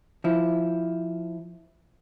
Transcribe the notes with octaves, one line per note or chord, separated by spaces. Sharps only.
F3 E4